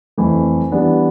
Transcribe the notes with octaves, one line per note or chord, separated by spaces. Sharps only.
F2 E3 A3
E3 G3 B3 D4